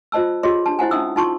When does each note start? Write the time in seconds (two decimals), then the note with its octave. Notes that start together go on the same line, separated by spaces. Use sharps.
0.12 F4 C5 D#5 A5 E6
0.43 F4 G4 G#4 C#5 D#5 C6
0.66 D4 A5
0.79 E4 C5 F#5 G#5
0.91 C#4 D#4 E5 D#6 E6
1.16 D#4 F4 A5 C6 C#6